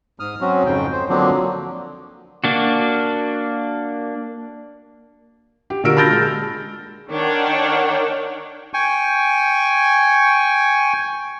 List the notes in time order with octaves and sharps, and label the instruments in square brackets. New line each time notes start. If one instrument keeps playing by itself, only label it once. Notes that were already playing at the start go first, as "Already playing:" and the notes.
[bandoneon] G#2 D#6 F6
F#3 C4 C#4 F#4
F2 G#2 C#3 G5
C5
D3 F3 F#3 A#3 C4 D4
[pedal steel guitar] A#3 D4 F#4
[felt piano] G4
A#2 D3 F#4 A#4 E6 D7
A5 B5 F6 G6 A6 A#6
G#3
[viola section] D#3 D4 C#5 F#5 G5
[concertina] G5 G#5 C#6